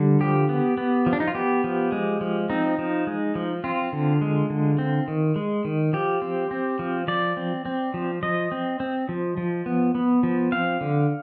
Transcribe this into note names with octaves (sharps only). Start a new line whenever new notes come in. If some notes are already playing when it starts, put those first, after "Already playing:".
Already playing: D3 G3
F3 G4
B3
B3
F3
D4
D#4
F4
B3 G4
F3
G#3
F3
C4 D#4
F3
G#3
F3
C4 F4
D3
G#3
D3
C4
D#3
G#3
D#3
F3 G4
C4
C4
F3
F3 D5
C4
C4
F3
F3 D#5
C4
C4
F3
F3
B3
B3
F3
C4 F5
D3